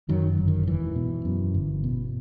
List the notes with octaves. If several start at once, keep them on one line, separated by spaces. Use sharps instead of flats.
F#2 D#3 F#3
G1
D#3
E1 E3
B2
F#2
G1
B2